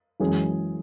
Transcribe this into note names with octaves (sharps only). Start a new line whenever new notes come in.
F#2 E3 G#3 C#4 G#4